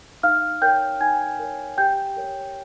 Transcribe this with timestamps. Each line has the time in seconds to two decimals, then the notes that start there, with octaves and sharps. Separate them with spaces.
0.23 D#4 F5 F6
0.62 A#4 C#5 G5 G6
1.00 D#4 G#5 G#6
1.39 A#4 C#5
1.77 G4 G5 G6
2.17 A#4 C#5